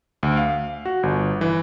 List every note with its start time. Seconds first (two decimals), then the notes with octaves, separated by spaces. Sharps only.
0.23 D2
0.37 F5
0.85 F#4
1.03 G1
1.41 E3